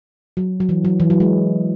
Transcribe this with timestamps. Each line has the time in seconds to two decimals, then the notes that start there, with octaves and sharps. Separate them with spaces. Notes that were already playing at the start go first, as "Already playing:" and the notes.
0.37 F#3
0.60 F#3
0.69 E3
0.85 F#3
1.00 E3
1.10 F#3
1.20 G#3